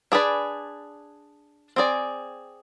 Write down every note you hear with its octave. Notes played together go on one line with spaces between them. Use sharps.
D4 G#4 B4 D5
C4 G#4 D5